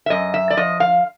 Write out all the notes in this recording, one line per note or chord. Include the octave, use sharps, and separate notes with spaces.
E5
F#2 D#5
E5
D5
F3 D#5
F5